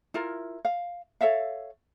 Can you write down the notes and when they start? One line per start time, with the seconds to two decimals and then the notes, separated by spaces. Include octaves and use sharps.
0.14 E4 F4 A#4
0.65 F5
1.21 A4 C#5 E5 F5